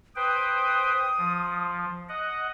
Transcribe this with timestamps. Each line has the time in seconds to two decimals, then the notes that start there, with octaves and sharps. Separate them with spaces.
0.16 B4 C5 G5 D#6
1.18 F3
2.09 D#5 F#5